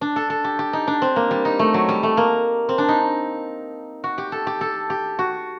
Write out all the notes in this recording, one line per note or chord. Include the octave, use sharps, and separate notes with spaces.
D4
A4
A4
G4
G4
D#4
D4
C4
A#3
G3
D#4
A3
F#3
G3
A3
A#3
C4
D4
D#4
F#4
G4
A4
G4
A4
G4
F#4